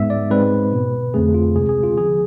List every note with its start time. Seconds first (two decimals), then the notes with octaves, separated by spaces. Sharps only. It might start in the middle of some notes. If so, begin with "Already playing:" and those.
Already playing: G#2 G#3 B3 E5
0.10 D5
0.30 G#2 G#3 C4 B4
0.72 B2 B3
1.14 F2 D3 A3 C4 G#4
1.34 F4
1.56 D2 C3 G#3 C4 G#4
1.69 G#4
1.83 F4
1.97 D3 F3 B3 G#4